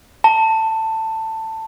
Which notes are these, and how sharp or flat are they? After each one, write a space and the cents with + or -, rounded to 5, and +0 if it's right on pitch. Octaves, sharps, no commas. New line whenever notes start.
A5 +15